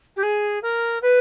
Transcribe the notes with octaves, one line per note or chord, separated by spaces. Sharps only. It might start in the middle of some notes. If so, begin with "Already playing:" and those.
G4
G#4
A#4
B4